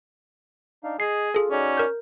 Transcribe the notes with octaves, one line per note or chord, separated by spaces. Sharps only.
D4 D#4 F5
G#4 D#5 C7
F4 G#4 A4
C#4 D#4 F#4 D5
A#4 G6